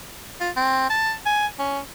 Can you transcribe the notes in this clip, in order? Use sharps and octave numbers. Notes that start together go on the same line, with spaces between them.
F4
C4
A5
G#5
C#4